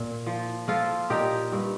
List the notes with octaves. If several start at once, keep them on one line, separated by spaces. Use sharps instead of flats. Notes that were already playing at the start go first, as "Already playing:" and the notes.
Already playing: A#2
F3
F3 F4 A4
A#2 D#4 G4
G2